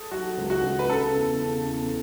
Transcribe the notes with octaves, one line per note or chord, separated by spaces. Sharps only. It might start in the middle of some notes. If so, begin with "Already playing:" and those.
Already playing: G#4 A4
F#3 F#4
C#2
F#4
C#2
B4
C#3 A4
E2
C#3
E2